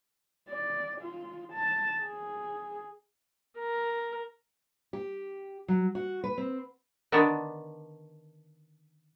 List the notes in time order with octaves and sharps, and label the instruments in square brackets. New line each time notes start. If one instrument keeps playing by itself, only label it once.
[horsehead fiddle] D5
F4
A5
G#4
[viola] A#4
[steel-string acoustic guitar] G4
F#3
F#4
B4
C4
[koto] D3 D#3 B3 D4